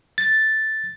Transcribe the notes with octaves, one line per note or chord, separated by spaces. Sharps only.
A6